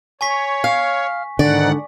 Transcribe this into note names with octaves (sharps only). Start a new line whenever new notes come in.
C#5 G#5 C#6 B6
F5
G#2 D3 D#3 D5 F#5